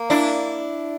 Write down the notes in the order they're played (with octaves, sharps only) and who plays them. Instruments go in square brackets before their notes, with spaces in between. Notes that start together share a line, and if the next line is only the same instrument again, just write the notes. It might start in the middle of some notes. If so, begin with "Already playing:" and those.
Already playing: [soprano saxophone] A#3
[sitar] D4 E4